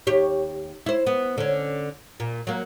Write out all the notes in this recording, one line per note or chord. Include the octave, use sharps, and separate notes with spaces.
D#2 G4 C#5
E4 C5
B3
D3 C#4
A#2
F#3 A#3